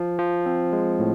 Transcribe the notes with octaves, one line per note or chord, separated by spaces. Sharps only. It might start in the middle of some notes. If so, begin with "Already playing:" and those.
Already playing: F3
F3
C4
G#3
A2